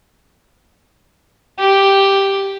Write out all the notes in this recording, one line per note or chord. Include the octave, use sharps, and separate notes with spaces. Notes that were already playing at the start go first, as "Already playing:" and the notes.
G4